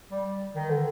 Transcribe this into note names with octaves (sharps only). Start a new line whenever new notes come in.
G3
D#3
D3